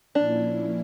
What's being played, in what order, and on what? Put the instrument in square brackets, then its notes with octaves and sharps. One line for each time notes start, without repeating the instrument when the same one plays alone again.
[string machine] A#2 F3 A#3 C#4 E4 [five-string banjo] D4